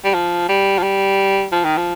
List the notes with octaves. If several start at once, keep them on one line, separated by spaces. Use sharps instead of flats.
G3
F3
G3
F3
G3
F3
D#3
F3